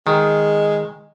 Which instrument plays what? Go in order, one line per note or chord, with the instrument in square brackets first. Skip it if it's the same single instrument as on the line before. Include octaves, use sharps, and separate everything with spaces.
[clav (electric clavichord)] D#3 [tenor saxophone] G#3